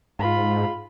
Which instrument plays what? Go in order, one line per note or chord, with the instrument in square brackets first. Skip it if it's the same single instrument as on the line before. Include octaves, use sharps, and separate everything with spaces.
[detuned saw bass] G#2 [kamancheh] F4 B5